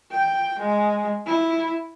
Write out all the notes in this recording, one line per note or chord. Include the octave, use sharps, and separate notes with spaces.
G5
G#3
E4